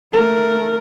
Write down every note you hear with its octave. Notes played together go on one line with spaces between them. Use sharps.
A3 A#4